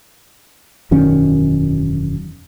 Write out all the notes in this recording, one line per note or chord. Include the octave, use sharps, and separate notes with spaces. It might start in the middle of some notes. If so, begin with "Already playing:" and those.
E1 F#2 D#3 C#4